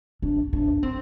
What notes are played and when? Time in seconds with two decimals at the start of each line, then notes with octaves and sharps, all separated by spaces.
0.22 D4
0.53 D4
0.83 C4